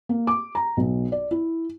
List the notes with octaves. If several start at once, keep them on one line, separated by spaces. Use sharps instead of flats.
A#3
D6
A#5
B1
D5
E4